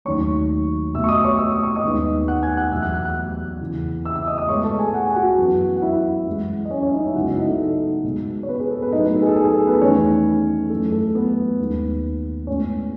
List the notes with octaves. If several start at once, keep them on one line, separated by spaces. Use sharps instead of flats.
D#2 D#3 F#3 A3 C#5 C#6
B2 A3 E5 E6
C#6
D#5 D#6
C#5 C#6
E6
D#6
C#6
D#5 D#6
D#2 D#3 G#3 B3
F#5 F#6
G#5 G#6
F#5 F#6
E2 B2 F#3 E5 E6
F#5 F#6
F#5 F#6
F#5 F#6
E2 C#3 E3
E5 E6
E5 E6
D#5 D#6
D#5 D#6
A2 G#3 B3 C#5 C#6
A4 A5
G#4 G#5
F#5
G#5
F#4 F#5
F#2 E3 B3
F#5
E4 E5
F#2 E3 G#3
D#5
C#4 C#5
C#4 C#5
D#4 D#5
E4 E5
F#2 C#3 G#3 B3 F#4 F#5
E4 E5
D#4 D#5
A4
A4
B2 G#3 B3
C#5
B3 B4
G#4
A4
B3 B4
A2 F#3 A3 D#4 D#5
B3 B4
A4
G#4
A4
G#4
A4
B3 B4
E2 D#3 A3 C#4 C#5
F#2 E3 A3 A4
A4
B3 B4
D#2 D#3 G#3 B3
A2 G#3 B3 C#4 C#5